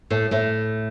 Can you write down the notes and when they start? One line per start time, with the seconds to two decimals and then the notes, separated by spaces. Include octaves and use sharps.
0.10 A2 A3
0.31 A2 A3